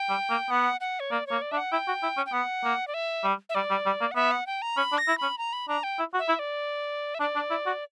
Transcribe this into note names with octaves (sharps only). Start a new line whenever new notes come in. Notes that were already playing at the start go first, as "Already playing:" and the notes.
Already playing: G5
G3
A#3
B3 F#5
F#5
C#5
A#3 D5
A#3 C#5
D5
D4 E5
F#5
E4 G5
F#4
E4
C#4
G5
B3 F#5
A#3
D5
E5
G3
E5
G3 D5
G3
G3
A#3
F#5
B3 E5
F#5
G5
A#5
C#4 B5
D4
A#6
E4
C#4 B5
A#5
B5
D4 A#5
G5
E4
F#4
E5
E4
D5
E5
D4 D5
D4
E4
F#4